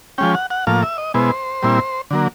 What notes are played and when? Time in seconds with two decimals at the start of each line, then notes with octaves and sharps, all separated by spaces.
0.18 F3 G#3 C#4 G5
0.35 F#5
0.50 F#5
0.67 A2 F3 A#3 F5
0.82 E5
0.98 D#5
1.14 B2 G#3 B3 E4 C5
1.63 A#2 G3 C4 E4
2.11 D3 F#3 A#3